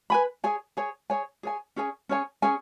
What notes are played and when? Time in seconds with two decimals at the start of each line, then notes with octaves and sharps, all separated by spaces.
0.10 B4 G#5 B5
0.44 G#4 C#5 G#5
0.77 G#4 C#5 G#5
1.10 G#4 C#5 G#5
1.43 G#4 C#5 G#5
1.76 C#4 G#4 C#5 G#5
2.09 C#4 G#4 C#5 G#5
2.42 C#4 G#4 C#5 G#5